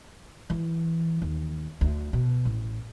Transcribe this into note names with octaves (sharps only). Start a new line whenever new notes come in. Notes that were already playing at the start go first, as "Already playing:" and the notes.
E3
D#2
D2
B2
A1